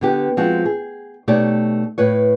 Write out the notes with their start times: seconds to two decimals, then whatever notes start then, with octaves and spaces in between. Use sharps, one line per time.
0.01 D3 B3 G4
0.37 F3 G#3 C4 F#4
0.65 G#4
1.28 B2 A3 D#4 G4 C#5 D5
1.98 A2 B4 C#5